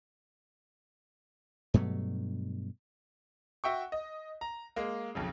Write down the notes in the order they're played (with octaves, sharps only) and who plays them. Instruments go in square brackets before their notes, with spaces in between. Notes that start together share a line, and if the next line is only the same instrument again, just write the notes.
[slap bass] G2 B2 F#3 A3
[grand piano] F#4 E5 G5 C#6
D#5
A#5
G#3 A#3
B1 F2 C#3